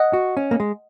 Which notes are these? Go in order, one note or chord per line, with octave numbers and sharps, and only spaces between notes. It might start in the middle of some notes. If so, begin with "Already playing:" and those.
Already playing: D#5 F#5 D#6 F#6
F#4
C#4
A#3
G#3